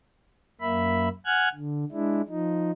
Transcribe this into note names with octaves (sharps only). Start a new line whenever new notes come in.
F#2 A#3 E5 B5
F#5 G#5 F6 F#6 G#6
D3
G#3 D4 E4
F3 D#4